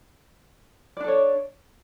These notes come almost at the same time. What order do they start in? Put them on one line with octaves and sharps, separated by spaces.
D5 D4 A4 C#5